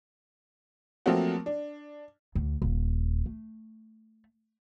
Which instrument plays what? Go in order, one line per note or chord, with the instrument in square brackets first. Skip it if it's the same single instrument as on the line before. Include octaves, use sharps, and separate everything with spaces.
[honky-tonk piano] F3 F#3 A3 A#3 C4 F#4
D4
[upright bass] D2
D#1
A3